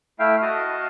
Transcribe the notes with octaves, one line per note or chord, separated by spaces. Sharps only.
A3 E4 E5 F5 G5
F#4 D#5 F5 A5 D#6